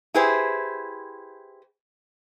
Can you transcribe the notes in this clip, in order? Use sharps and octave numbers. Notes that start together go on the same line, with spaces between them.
E4 G4 G#4 B4 C5